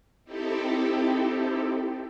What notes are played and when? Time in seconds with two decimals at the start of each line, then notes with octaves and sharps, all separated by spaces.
0.24 C4 D#4 E4 G4 A4